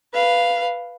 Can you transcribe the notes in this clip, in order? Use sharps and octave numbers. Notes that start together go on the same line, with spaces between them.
B4 F5